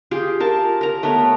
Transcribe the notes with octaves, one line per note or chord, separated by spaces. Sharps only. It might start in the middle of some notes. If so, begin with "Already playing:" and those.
F4 G4 G#4
A#4 A5
A#4 A#5
A3 B3 A#4 C#5